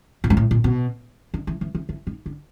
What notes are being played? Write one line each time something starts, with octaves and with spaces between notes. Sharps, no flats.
A#2
G#2
A2
A#2
B2
D3
E3
E3
E3
E3
D#3
D3